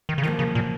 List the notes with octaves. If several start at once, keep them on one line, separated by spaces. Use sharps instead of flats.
D#3
C#3
F#2 D#3 F3 A#3
C#3
A#2